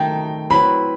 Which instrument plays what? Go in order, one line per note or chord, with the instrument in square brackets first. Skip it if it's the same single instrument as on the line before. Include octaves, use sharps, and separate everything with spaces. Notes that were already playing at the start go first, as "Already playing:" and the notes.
Already playing: [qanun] D#3 A3 D#4 [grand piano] G5
[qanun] F#3 C4 E4 B4 [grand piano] B5